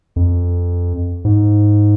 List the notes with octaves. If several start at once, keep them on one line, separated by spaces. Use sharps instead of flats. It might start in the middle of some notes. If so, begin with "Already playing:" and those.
F2
G#2